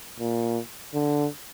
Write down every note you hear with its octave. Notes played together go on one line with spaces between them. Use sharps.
A#2
D3